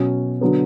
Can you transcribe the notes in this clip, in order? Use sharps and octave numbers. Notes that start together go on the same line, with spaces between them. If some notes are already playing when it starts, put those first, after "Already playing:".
Already playing: B2 F#3 C#4
D3 F#3 B3